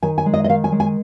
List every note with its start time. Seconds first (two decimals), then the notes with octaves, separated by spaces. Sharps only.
0.03 D#3 G#5
0.18 G#5
0.26 G#3
0.34 D#5
0.44 D#5
0.49 D#3 F5
0.64 G#5
0.72 G#3
0.80 G#5